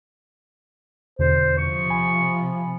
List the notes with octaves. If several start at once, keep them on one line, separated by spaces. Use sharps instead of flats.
E2 B2 D3 C5
C3 F3 C#6
G#5 B5